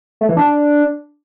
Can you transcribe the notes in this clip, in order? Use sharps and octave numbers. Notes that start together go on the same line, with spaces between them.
A3
E3
D4